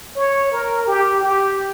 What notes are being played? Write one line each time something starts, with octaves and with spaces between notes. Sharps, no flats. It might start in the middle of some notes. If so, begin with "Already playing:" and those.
C#5
A#4
G4
G4